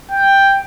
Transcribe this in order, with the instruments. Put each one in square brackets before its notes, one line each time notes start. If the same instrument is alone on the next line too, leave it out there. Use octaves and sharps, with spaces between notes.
[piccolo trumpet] G5